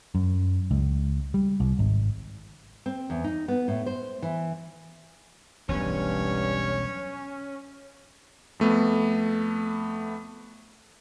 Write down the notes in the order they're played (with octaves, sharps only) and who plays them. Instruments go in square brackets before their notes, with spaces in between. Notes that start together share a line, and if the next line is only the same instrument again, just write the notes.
[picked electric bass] F#2
C#2
G3
C2
G#1
[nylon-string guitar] C4
E2
D#4
B3
A2
C5
E3
[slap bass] E1 B1 E2 [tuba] G2 [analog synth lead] C#4 [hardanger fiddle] C#5
[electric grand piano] F2 A3 B3